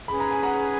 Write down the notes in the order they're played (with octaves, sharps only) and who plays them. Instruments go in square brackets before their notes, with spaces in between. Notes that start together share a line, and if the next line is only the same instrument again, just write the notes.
[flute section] C#4 G#4 B4 [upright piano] B5
[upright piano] A#5
G#5
F#5 A#5